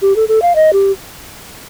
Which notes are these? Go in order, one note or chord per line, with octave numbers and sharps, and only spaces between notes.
G4
A4
A4
F5
D#5
G4